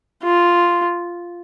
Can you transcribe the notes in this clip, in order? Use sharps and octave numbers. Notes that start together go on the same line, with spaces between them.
F4